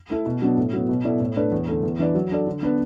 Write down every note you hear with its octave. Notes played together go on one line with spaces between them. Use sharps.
A3 E4 A4
B2
F#3 B3 D4
A2
F#3 B3
B2
B3 E4 A4 D5
A2
A3 D4 B4 D5
E2
D3 A3
E2
E3 D4 B4 D5
F#3
D4 A4 D5
D3
B3 D4 B4